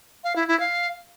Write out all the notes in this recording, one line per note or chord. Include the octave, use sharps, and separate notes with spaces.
F5
E4
E4
F5